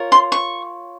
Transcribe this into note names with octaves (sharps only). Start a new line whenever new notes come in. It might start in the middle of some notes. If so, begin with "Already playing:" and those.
Already playing: F4 A#4 C#5
C6
C#6